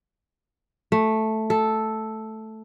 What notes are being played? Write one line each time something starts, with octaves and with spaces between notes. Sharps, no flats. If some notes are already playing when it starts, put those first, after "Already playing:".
A3
A4